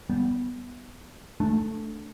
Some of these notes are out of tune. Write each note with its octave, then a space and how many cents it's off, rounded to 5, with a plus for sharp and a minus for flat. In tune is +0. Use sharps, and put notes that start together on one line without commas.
G3 +0 B3 +0
A3 +0 D4 +0